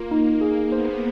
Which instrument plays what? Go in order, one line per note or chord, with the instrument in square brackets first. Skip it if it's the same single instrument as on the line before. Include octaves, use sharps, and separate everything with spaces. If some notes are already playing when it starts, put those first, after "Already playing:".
Already playing: [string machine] A#3 [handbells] F4
[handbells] D#4
G#4
[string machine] B3 [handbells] C5